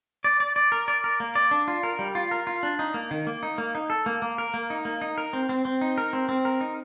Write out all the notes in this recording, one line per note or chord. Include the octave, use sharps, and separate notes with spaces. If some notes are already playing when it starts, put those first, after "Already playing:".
D5
D5
D5
A#4
D5
A#4
A#3
D5
D4
F4
A#4
G3
F4
A#4
F4
D4
D#4
A#3
D#3
A#3
D#4
A#3
D#4
A4
A#3
A#3
A#4
A#3
D#4
A#3
D#4
A#4
C4
C4
C4
D#4
A#4
C4
C4
A#4
D#4